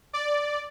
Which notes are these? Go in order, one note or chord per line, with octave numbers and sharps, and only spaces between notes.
D5